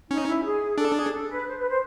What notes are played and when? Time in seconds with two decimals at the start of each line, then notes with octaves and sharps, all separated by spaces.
0.10 C#4 D#4
0.27 E4
0.44 G#4
0.78 D4 A4
0.95 G#4
1.12 A4
1.29 B4
1.46 C5
1.58 B4
1.69 C5